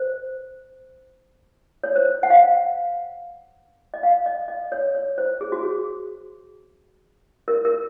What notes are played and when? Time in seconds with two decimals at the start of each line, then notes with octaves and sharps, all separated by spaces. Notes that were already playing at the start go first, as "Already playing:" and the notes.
Already playing: C5
1.84 C#5
1.96 C5
2.23 F#5
2.30 F5
3.94 D#5
4.03 F5
4.26 D#5
4.48 D#5
4.72 C#5
4.95 C#5
5.18 C5
5.41 G#4
5.52 F#4
5.63 G#4
7.48 A#4
7.65 A#4